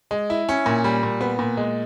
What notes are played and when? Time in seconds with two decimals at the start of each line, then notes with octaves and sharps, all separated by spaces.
0.11 G#3
0.30 E4
0.49 C#4
0.66 A#2
0.84 G3
1.03 A#2
1.21 B3
1.39 A#2
1.57 G#3